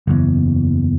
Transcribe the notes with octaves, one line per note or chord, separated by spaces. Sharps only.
F#1 E2